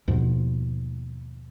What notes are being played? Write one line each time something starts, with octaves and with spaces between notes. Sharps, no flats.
D#2 G#2 B2 F3